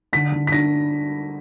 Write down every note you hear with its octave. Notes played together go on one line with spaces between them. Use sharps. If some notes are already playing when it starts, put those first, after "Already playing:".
D3 B6
D3
B6
D4 A#6